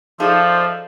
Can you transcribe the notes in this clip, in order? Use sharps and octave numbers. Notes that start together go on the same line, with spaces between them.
F3 D#4 G#4 A4 C5 D5 E5 F5